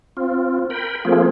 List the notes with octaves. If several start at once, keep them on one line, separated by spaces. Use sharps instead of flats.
C4 F4
A#4 G5 B5
F3 A3 A#3 C4 F4 G#4